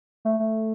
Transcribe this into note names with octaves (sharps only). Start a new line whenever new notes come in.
A3
A3